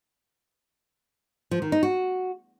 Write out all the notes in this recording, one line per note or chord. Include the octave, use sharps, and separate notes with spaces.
F3
D#3
D#4
F#4